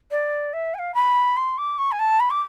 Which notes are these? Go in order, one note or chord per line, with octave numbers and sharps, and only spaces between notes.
D5
E5
G#5
F5
B5
C6
D6
C#6
G#5
A5
B5
D6